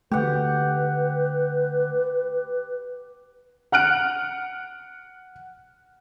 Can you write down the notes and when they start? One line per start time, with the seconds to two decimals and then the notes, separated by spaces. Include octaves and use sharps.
0.11 D3 A3 G4 B4 F#5
3.72 F#5 F6 F#6 D7